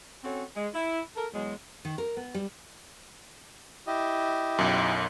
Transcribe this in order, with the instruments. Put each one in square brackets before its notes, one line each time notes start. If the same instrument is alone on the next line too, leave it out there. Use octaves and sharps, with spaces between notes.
[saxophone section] C4 C#4 F#4 A4 C#5
G#3
E4
A4 A#4
E2 F#3 G#3
[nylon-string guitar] D#3
A#4
B3
G3
[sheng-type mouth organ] E4 G4 D#5
[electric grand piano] B1 F#2